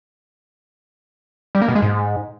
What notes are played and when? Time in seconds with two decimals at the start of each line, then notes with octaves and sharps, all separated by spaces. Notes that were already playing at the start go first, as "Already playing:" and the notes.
1.55 G3
1.62 A#3
1.68 B2
1.75 G#3
1.82 G#2